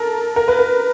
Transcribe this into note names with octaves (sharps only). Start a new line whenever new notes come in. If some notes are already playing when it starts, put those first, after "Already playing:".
Already playing: A4 A#4
A#4
B4
A#4